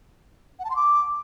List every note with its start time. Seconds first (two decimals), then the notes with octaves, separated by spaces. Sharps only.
0.59 F#5
0.65 A5
0.70 C6
0.76 D6